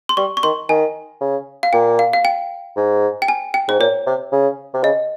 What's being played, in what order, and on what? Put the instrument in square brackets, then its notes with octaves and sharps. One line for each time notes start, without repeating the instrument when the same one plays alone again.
[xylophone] C6
[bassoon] G3 [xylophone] C#6
[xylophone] C#6
[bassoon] D#3 [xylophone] C6
[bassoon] D#3 [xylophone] G#5
[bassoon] C#3
[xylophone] F5
[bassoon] A#2 [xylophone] G5
[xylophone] F5
F5
G5
[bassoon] G#2
[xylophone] G5
G#5
G5
[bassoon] G#2 [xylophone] C5
[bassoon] A#2 [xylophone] C#5
[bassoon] C3
C#3
C3
[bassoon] C#3 [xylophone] D#5